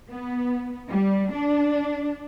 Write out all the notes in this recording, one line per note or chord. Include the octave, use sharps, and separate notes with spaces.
B3
G3
D4